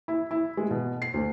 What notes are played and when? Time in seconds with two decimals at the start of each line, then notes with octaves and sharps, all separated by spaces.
0.08 E4
0.31 E4
0.57 G#3
0.71 B2
1.02 C7
1.14 D2